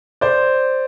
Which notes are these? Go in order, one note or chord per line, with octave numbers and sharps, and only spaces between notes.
C5 D5